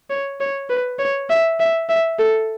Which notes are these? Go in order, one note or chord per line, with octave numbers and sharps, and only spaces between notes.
C#5
C#5
B4
C#5
E5
E5
E5
A4